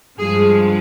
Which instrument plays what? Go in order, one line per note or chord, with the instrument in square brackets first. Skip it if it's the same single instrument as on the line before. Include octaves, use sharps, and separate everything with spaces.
[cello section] G2 F3 G#3 G#4